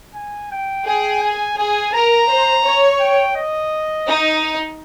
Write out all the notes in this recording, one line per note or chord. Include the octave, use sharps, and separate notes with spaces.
G#5
G5
G#4 G5
G#5
G#4 G#5
A#4 A#5
C5
C#5
G5
D#5
D#4